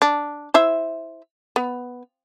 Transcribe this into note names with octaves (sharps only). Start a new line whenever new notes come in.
D4
E4 C5 E5
B3